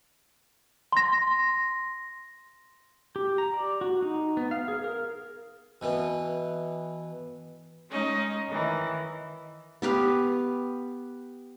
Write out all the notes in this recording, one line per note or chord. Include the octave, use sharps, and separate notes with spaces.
C6 A#6
G4
A#5
D5
F#4
D#4
B3
F5
G#4
A#4
B2 E3 B3
G#3 C#4 D#4 D#5
D#3 E3
B3 G4 B4 F5